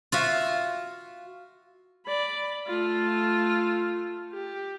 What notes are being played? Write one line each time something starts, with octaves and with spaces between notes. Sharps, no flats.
F4 F#4 E5
D5 B5
A3 F4
G4